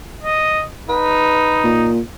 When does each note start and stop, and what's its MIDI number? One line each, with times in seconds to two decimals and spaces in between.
0.23 0.64 75
0.89 1.92 63
0.89 1.69 71
1.64 2.00 46